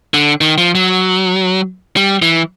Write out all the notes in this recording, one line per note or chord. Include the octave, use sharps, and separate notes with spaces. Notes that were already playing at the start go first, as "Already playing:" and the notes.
D3
D#3
F3
F#3
G3
E3